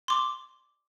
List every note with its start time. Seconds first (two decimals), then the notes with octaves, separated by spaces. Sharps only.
0.08 C6 D6